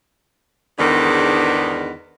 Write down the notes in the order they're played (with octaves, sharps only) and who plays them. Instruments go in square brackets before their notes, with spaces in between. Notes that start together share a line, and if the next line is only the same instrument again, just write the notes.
[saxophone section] E2 G#2 D3 D#3 B3 D4